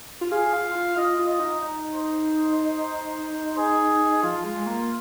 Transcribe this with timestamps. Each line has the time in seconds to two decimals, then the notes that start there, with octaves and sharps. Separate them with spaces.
0.21 F4
0.32 G#4 F5
0.53 F4
0.75 F4
0.97 F4 D#5
1.19 F4
1.29 D#5
1.40 D#4
1.62 D#4
1.94 C5
3.58 G#4
4.23 F3 F4
4.44 G#3
4.56 G#3
4.66 A#3